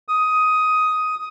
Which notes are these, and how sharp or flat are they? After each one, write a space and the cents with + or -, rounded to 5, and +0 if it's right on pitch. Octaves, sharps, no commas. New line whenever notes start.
D#6 +10